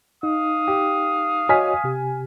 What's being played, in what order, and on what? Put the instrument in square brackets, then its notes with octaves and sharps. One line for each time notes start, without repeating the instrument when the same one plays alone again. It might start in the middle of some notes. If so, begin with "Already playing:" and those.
[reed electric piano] D#4 [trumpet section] F5 D#6
[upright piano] G4
[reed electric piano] F#4 C#5 D#5 [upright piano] G#5 F6 B6
[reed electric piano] C3 G4